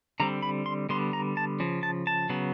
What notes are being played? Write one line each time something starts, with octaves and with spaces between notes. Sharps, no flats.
D3 G3 C4 A#5
B5
C6
D3 G3 B3 C6
A#5
A5
C#3 F3
A5
A5
C#3 F#3 B3